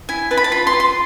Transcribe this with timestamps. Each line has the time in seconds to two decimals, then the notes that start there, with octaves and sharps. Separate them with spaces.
0.09 E4 G#5
0.31 B4 A5
0.37 B5
0.44 A5
0.52 F4 B5
0.67 C6
0.73 F4
0.80 C6